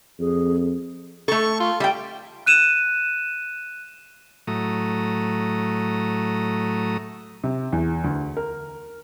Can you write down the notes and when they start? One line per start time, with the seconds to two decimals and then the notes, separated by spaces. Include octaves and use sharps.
0.20 F2 G#4
1.28 A3 A4 C#6
1.60 F4
1.80 G3 E5 G5
2.46 F#6 D#7 E7
4.48 A2 F#3 A3 A#5 D#6
7.44 C3
7.73 E2
8.04 D2
8.37 A#4